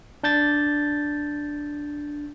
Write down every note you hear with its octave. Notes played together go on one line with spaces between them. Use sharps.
D4 G6 A6